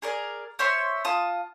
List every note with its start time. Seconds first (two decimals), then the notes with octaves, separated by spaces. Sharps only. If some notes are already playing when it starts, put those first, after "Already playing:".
0.02 G#4 A#4 D5
0.59 C5 C#5 E5 C6
1.05 F4 A5 D#6